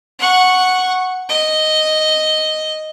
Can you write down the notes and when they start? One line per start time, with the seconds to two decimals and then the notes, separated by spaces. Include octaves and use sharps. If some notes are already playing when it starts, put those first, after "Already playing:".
0.19 F#5 C#6
1.29 D#5